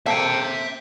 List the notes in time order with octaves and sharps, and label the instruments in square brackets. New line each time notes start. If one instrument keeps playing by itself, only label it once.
[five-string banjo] A#3 C4 A4 [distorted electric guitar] E5 G5